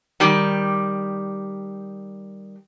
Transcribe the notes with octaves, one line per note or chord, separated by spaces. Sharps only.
D#3 G3 G4